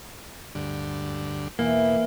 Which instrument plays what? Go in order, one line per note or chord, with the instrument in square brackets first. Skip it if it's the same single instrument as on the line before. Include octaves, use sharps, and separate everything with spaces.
[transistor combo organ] D2 G2 D3
[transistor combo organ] E2 B2 [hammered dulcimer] E3 [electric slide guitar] A#3